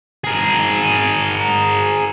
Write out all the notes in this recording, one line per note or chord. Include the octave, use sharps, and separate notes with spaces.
G#4 A#4